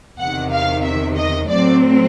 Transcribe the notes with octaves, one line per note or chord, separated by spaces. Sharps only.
E2 C3 D#3 F#5
F5
E5
D#5
A2 F#3 A3 C4 D5